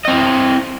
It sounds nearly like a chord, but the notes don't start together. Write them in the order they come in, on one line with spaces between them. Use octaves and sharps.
D#5 C4 E4